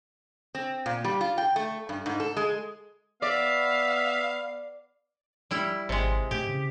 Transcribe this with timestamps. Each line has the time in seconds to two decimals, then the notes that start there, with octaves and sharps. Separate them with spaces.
0.55 C4
0.86 A#2
1.05 G3
1.21 F4
1.38 G5
1.56 A3
1.89 G2
2.06 G#2
2.20 A4
2.37 G#3
3.22 B3 D5 E5 F5
5.51 G3 E4
5.89 G#1 C3 G#3
6.31 A2 G4
6.48 C#3